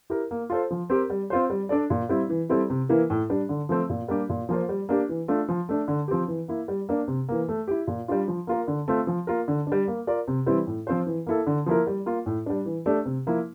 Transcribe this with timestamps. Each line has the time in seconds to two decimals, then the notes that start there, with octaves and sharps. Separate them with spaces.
0.10 E4 G4 A#4
0.31 A#3
0.50 F4 A4 C5
0.71 F3
0.90 C4 G4 A#4
1.10 G3
1.30 C4 F4 C5
1.50 G3
1.69 D4 A4 D5
1.90 A#2
2.09 G3 C4 E4
2.30 E3
2.49 G3 C4 E4 A4
2.70 C3
2.89 E3 A#3 E4 A#4
3.10 A2
3.30 G3 D4
3.49 D3
3.69 F3 A3 C4
3.90 A#2
4.08 G3 A#3 D4 G4
4.30 A#2
4.49 F3 A#3 F4 C5
4.69 G3
4.89 A#3 D4 G4
5.09 E3
5.28 A3 D4 F4
5.49 F3
5.69 A3 D4
5.88 D3
6.08 F3 C4 G4
6.28 E3
6.48 A#3 E4
6.68 G3
6.89 A#3 D4
7.08 C3
7.29 E3 A#3
7.48 A3
7.67 E4 G4
7.87 A#2
8.08 G3 D4 F4
8.28 F3
8.47 A#3 F4 A#4
8.67 D3
8.88 A3 C4 F4
9.07 F3
9.27 A#3 F4 A#4
9.48 D3
9.67 D4
9.72 G3
9.88 A#3
10.07 F4 A#4 D5
10.28 C3
10.46 E3 G3 C4 E4
10.67 A2
10.87 F3 C4 F4 C5
11.07 E3
11.26 A#3 E4 A4
11.47 D3
11.66 F3 A#3 E4 A#4
11.87 G3
12.06 A#3 F4
12.26 A2
12.46 G3 D4
12.66 E3
12.86 A3 D4 G4 D5
13.05 C3
13.27 F3 A#3 E4